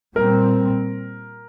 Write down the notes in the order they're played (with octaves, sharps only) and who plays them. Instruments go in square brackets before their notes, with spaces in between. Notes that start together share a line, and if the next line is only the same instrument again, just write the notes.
[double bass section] A#2 G3 C4 [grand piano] A#4